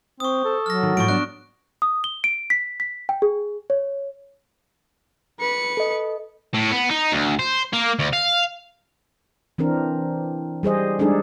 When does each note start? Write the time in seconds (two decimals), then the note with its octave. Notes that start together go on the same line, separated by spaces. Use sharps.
0.20 C4 C5 C#6 D#6
0.45 A4
0.66 F#3 F6 A#6
0.83 D#3
0.97 A2 F3 C#6 D7
1.08 B3 D4 D#4 F#6
1.82 D#6
2.04 G7
2.24 D7
2.50 B6
2.80 B6
3.09 G5
3.22 G#4
3.70 C#5
5.40 B4 C#7
5.77 A4 D#5
6.54 A2
6.71 B3
6.90 D#4
7.12 D2
7.39 C5
7.73 A#3
7.99 D2
8.13 F5
9.58 E3 C4 D4 A#4
10.63 G3 G#4 C5 D#5
10.99 G3 G#3 D4 D#4 G#4 A4